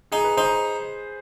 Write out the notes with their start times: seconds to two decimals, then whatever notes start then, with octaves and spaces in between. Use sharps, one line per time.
0.12 D#4 G#4
0.24 B4
0.37 D#4 C5